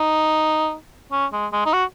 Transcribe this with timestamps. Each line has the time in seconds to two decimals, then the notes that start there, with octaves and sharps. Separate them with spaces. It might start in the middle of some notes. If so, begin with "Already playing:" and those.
Already playing: D#4
1.12 C#4
1.33 G#3
1.53 G#3
1.66 D#4
1.74 F#4